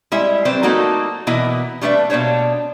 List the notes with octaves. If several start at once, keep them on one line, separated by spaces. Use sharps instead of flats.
G3 G#3 E4 E5
F#3 C4 B4 C5 D5
A3 A#3 D#4 F#4 A4
B2 E3 A#3 E4 D#5
G3 A3 D4 B4 E5
B2 A#3 D4 C5 C#5